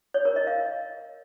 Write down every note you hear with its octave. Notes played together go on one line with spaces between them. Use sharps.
C#5
A#4
D#5
F5